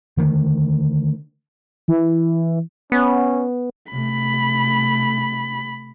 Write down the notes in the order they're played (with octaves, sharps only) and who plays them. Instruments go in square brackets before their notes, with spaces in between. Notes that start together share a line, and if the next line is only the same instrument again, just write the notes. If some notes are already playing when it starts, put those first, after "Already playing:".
[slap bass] D3 D#3 G#3 A3
[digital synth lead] E3
[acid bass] B3 [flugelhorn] C#4
[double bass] C3 A3 [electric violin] B5